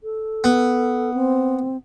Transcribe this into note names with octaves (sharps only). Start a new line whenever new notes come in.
A4
B3
C4